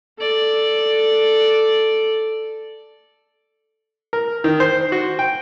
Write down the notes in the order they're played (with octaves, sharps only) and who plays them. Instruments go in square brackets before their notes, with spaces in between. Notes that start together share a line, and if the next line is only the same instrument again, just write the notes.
[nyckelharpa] A4 D5
[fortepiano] A#4
D#3
C5
F#4
G5